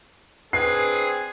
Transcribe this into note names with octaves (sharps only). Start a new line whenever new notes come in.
C4 D4 G#4 B4 C7